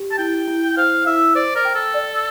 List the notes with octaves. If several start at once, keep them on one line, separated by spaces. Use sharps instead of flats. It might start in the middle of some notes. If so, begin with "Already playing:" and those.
Already playing: G4
A5
E4 G5
E4
C5 F5
E4 E5
C5 D5
A#4
G5
A4
D5